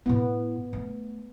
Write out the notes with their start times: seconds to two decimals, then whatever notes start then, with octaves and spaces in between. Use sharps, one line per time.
0.06 A2 B3 E4
0.73 A3